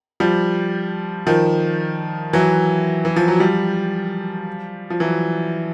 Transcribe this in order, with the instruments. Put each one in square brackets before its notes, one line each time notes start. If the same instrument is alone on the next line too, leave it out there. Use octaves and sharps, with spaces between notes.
[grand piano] F3 G3
D#3 F3
E3 F#3
E3
F3
F#3
F3 G3
F3
E3 F#3